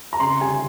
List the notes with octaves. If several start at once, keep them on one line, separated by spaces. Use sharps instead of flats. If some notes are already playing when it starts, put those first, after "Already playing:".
A#5
C#3 C6
G3 G#5